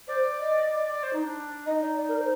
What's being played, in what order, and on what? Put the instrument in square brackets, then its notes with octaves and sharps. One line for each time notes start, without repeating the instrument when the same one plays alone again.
[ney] C5 [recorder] D5
[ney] D#5
[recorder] D5
D5
C5
D#4
D4
[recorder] D#4 [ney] D#5
[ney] D5
D5
A#4
C5